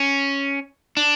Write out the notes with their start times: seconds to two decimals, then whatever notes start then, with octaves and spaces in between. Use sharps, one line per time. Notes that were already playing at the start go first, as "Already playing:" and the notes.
Already playing: C#4
0.97 D4